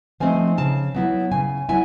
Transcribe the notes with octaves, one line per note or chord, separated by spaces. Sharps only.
F3 A3 C4 D#4 G#5
C#3 A5
F#3 B3 E4
C#3 G#5
F#3 B3 E4 G#5